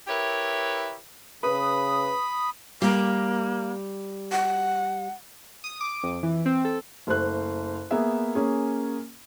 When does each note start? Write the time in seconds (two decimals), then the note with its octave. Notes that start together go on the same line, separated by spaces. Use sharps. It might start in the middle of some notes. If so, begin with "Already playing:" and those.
0.07 E4 G4 A#4 B4 C#5 E5
1.43 C#3 B4 B5 D#6
2.82 G3 A#3
4.32 F#5
5.64 D#6
5.81 D6
6.03 F2
6.23 E3
6.46 C4
6.65 A4
7.07 F#1 A3 C5 F#6
7.91 A#3 B3 G#4 E5
8.35 A#3 C#4 G#4